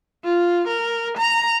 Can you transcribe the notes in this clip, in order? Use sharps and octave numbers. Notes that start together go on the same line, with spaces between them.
F4
A#4
A#5